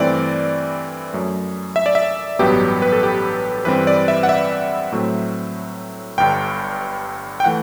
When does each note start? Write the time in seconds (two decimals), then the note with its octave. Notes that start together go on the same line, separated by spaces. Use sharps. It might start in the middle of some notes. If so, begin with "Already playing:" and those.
Already playing: G2 E3 A3 C4 D5
1.13 F#2 F#3 A3
1.76 E5
1.86 D5
1.95 E5
2.39 A1 G2 F#3 B3 G4
2.82 B4
2.92 A4
3.03 G4
3.65 G2 E3 G3 C4 B4
3.87 D5
4.08 E5
4.23 F#5
4.29 E5
4.92 A2 F#3 A3 C4
6.18 G1 G2 D3 G5
7.40 G5
7.44 E3 A3 F#5